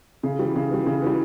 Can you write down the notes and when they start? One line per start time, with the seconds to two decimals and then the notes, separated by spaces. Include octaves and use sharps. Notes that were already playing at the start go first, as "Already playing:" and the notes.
0.23 C#3
0.39 E3 G3
0.55 C#3
0.71 E3 G3
0.86 C#3
1.02 E3 G3